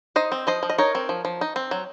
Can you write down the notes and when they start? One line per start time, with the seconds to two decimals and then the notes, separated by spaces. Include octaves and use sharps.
0.16 D#4 C5 D#5
0.32 C4
0.47 F3 C5 D#5
0.63 F3
0.70 D#5
0.78 D#4 A#4 C#5
0.95 C4
1.09 F3
1.25 F3
1.41 D#4
1.56 C4
1.71 F#3